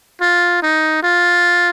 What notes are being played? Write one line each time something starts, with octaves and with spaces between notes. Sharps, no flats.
F4
D#4
F4